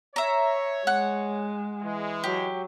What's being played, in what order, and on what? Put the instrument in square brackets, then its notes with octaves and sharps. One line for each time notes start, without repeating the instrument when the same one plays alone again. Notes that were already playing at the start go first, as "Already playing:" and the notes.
[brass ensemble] C#5 [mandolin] E5 A#5
[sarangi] G#3 [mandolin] F#5
[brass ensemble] E3 G#3
[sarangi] F#3 [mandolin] G4